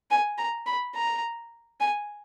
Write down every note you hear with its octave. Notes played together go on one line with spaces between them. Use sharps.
G#5
A#5
B5
A#5
G#5